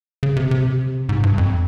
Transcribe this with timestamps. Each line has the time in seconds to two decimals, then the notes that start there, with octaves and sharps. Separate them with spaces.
0.23 C#3
0.36 C3
0.51 C3
1.09 G#2
1.23 G2
1.38 F2